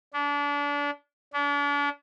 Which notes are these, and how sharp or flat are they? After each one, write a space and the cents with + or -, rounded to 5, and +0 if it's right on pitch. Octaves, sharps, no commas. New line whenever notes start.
D4 -30
D4 -40